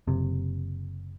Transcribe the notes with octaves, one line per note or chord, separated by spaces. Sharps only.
F#1 C3